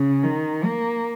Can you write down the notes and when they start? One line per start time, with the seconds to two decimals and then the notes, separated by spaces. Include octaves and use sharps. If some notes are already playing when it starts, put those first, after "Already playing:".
Already playing: C#3
0.23 D#3
0.64 A#3